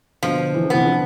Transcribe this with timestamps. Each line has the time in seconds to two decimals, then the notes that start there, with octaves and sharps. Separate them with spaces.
0.23 B2 D3 F3
0.54 E3
0.64 D3
0.70 C3 E3 B3
0.85 D3 F3